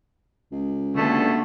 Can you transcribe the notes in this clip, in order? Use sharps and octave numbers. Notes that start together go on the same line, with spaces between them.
C#2
G2 B2 D3 A3 A#3